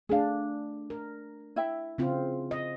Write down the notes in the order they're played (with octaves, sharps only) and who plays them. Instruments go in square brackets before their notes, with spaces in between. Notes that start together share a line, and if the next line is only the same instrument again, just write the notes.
[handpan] A3 D4 [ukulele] G#4 F5
[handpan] A#4
[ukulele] E4 E5 G5
[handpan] C#3 C4 F4
D#5